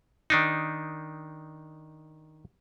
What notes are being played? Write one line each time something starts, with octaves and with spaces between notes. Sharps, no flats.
D#3 D4 D#4